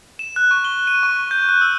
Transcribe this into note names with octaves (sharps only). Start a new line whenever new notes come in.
E7
F#6
C#6
G7
D#7
C#6
G6
F#6
E6